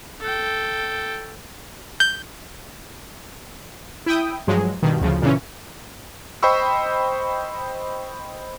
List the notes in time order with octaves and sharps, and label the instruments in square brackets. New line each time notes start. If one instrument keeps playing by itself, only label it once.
[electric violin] A4 G5
[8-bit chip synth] G6
[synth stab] E4 G5 D#6
G2 F3 F#3 G#3
G2 B2 D#3
D2 C#3 F3
A#2 C#3 E3 C#4
[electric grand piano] C5 D#5 G5 B5 C#6 E6